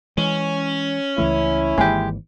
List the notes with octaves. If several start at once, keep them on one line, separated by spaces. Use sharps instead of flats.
E3 G#3 C#4
C#2 E3 A3 E4
G#1 E3 G#3 A#3 G4